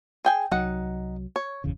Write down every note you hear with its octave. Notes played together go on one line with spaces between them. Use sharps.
G#4 G5 G#5
C2 F#3 D#4 F#5
C#5
G1 E2 C#3